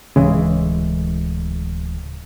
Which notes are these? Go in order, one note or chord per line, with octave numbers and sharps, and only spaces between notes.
D1 C#3 E3 G#3